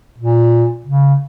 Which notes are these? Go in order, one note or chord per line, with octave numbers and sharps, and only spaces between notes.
A#2
C#3